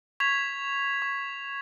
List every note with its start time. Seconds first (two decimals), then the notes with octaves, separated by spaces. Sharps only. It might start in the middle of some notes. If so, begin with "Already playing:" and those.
0.20 C#6 G#6 B6 F7
1.02 C#6